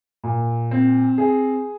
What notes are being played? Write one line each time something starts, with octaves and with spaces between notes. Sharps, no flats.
A#2
C4
G#4